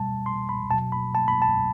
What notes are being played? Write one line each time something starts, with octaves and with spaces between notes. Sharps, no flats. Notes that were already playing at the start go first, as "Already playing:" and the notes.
Already playing: B2 G3 A5
C6
B5
B2 F#3 A5
B5
A5
B5
A5